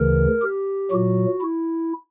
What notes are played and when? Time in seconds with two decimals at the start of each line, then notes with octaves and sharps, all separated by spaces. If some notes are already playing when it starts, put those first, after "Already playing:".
Already playing: D2 C#3 E3 A#4
0.42 G4
0.91 A#2 F#3 F#4
1.41 E4